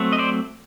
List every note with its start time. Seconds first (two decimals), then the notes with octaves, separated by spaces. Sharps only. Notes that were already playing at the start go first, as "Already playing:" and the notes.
Already playing: F#3 A3 C4
0.13 D#5
0.18 C5 D5